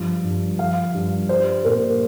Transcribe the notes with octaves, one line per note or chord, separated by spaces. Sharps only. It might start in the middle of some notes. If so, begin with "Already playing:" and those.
Already playing: G2 F3
G2
F3 F5
G2
G3 C5
A#2 A#4